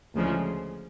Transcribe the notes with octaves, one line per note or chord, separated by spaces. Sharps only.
D2 C#3 F3 G#3